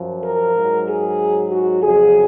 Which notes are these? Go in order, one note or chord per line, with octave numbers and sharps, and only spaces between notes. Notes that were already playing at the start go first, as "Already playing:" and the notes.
Already playing: F#2 F3
A#4
G#2 F#3
G#4
F#4
F2 C#3 F#3 G#4